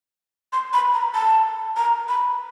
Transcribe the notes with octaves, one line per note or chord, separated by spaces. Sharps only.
C6
B5
A#5
A5
A#5
B5